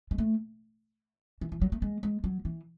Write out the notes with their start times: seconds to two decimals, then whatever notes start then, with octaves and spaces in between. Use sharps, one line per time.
0.11 G#3
0.18 A3
1.41 E3
1.52 E3
1.61 F#3
1.72 A3
1.82 G#3
2.03 G#3
2.24 F#3
2.45 E3